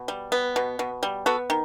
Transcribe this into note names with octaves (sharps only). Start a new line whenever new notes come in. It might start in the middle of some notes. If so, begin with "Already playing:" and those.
Already playing: B2
G3
B3
B2
B2
G3
B3 F#4 A4
D#3